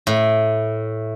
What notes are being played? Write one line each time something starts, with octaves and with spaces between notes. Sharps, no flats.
A2